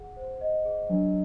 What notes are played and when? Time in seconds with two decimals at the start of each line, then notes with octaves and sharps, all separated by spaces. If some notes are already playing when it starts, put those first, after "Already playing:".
Already playing: G#4 F#5
0.17 C5
0.41 D#5
0.65 G#4
0.89 F#3 D4